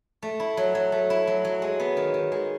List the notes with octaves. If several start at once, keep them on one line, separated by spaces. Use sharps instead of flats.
A3
E4
F#3
F#3
A3
E4
F#3
F#3
G#3
B3
D#3
D#3
G#3